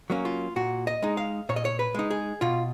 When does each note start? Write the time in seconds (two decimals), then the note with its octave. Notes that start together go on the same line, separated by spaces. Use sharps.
0.10 F#3 A#3 C#4
0.25 F4
0.56 A#2 F#4
0.87 D#5
1.02 G#3 D#4
1.17 F5
1.49 A#2 C#5
1.56 D#5
1.65 C#5
1.79 B4
1.95 G#3 D#4
2.11 G#4
2.41 B2 F4